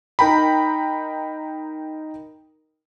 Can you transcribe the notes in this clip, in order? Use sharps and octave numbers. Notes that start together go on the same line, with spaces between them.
D#4 A#4 G5 A#5 B5